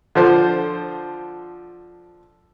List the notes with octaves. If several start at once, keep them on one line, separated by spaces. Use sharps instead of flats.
D3 F3 C5